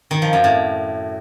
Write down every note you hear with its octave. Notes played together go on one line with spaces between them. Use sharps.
D#3
F3
F#2
A2